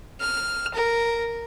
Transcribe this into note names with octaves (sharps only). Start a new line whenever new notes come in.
F6
A#4